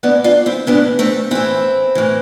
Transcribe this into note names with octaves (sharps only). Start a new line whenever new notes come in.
A2 E3 B3 D4
D4 F4
C4 E4
A2 E3 B3 D4
A3 C4
A2 E3 C4 E4
A2 E3